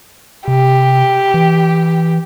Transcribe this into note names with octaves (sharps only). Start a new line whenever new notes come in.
C3 G4
E3